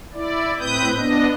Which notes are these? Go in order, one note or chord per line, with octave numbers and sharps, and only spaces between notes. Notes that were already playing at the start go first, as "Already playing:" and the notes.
E4 D5
A2 C4 B4 D#6 G6
B3 D4 D#5